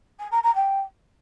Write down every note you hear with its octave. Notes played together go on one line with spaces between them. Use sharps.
G#5
A#5
A#5
G5